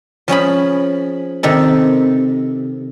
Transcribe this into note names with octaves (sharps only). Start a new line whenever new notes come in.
F3 C#4 G#4 B5
C3 D#3 A4